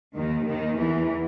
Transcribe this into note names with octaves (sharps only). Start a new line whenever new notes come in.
D#2 D#3
D#2 D#3
E2 E3